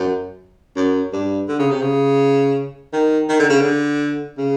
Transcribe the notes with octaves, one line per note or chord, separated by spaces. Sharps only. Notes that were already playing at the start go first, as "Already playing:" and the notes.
Already playing: F#2
F#2
G2
D3
C#3
C3
C#3
D#3
D#3
D3
C#3
D3
C#3